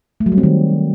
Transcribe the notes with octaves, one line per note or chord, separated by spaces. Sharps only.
A3
F#3
G3
C4
D#3